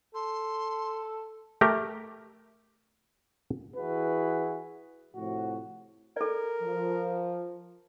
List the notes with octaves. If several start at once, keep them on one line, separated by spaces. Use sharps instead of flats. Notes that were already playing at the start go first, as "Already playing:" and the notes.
A4 C6
A3 G4 A#4
E3 E4 F#4 G#4 B4
A2 C3 F3 F#4
A4 A#4 D5
F3